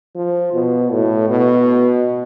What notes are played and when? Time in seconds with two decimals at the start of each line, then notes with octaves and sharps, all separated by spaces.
0.15 F3
0.54 B2
0.92 A2
1.30 B2